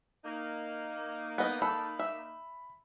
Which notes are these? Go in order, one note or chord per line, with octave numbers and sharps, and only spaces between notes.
A#3 D#4
B3 D#5
A4 B5
E5